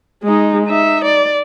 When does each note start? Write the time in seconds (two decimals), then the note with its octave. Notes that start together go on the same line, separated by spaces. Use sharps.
0.23 G#3 D#4
0.66 D#4 E5
1.04 D5